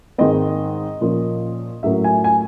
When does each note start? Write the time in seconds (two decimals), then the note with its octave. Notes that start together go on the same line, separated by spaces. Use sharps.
0.18 G#2 D#3 G#3 C4 D#5
1.01 A#2 F3 A#3 C#4
1.83 A2 F#3 A#3 C#4 E5
2.04 G#5
2.24 G#5